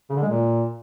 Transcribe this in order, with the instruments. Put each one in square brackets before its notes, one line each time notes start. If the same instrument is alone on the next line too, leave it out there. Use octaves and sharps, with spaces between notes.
[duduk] C#3
D3
G#3
A#2